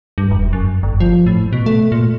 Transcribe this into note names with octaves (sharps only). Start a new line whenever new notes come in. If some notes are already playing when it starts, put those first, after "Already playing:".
G2
E1
F#2
G1
F3
A2
B2
A3
A#2